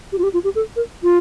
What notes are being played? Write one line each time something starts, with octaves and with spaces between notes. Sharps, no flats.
G4
F4
G4
F4
G4
A4
A#4
F4